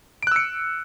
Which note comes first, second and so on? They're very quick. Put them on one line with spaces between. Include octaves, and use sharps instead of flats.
D7 F#6 E6 C#7